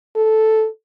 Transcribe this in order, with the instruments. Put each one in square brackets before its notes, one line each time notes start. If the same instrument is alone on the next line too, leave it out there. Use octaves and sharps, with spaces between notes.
[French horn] A4